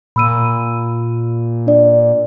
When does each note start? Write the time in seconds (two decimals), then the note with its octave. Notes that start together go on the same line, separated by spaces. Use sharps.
0.16 A#2 B5 E6 D#7
1.67 D4 D5